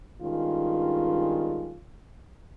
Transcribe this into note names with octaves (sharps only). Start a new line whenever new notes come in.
G2 D#3 G#3 C#4 F4